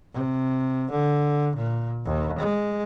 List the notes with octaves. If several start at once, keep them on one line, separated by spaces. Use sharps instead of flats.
C3
D3
A#2
D#2
G#3